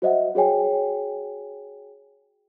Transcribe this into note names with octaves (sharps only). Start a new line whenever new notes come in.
F#4 C5 D#5 E5 F#5
F#4 G#4 C#5 G5 G#5